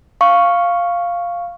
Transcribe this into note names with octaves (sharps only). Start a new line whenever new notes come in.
F5 C#6